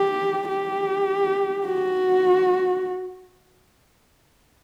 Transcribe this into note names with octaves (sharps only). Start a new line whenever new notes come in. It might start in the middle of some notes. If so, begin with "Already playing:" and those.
Already playing: G4
G4
F#4